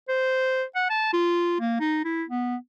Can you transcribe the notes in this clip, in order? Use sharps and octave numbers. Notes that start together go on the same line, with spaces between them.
C5
F#5
A5
F4
A#3
D#4
E4
B3